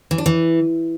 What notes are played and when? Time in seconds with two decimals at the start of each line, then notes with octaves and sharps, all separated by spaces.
0.11 E3
0.18 D4
0.26 E3